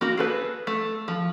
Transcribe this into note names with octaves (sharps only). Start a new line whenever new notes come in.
A#3 F#4 A#4
G#4 A4 B4
A3
F3